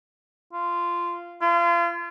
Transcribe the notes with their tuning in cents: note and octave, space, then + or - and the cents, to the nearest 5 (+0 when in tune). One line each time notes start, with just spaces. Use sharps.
F4 -15
F4 -35